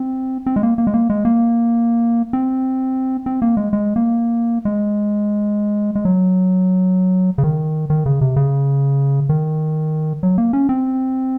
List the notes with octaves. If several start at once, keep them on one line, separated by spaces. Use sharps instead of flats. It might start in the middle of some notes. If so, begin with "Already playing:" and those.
Already playing: C4
C4
G#3
A#3
A#3
G#3
A#3
G#3
A#3
C4
C4
A#3
G#3
G#3
A#3
G#3
G#3
F#3
C#3
D#3
D#3
C#3
C3
C#3
D#3
F#3
A#3
C#4
C4